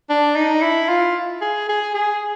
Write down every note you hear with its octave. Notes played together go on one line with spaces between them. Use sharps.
D4
D#4
E4
F4
G#4
G#4
G#4